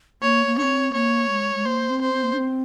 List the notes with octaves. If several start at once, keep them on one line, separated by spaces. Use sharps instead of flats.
A#3 C#5
A#3
C4 D4 C#5
A#3 C#5
G#3
G#3
A#3 C5
C4
C5
C4
A#3
D4
C4